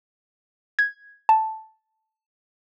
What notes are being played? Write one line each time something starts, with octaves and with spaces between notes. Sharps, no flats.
G#6
A5